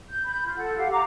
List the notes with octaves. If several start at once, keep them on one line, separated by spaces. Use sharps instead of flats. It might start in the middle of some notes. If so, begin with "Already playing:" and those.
G6
B5 G6
F4
A4 F#5
G4 F5 F#5
F#5 A#5 D6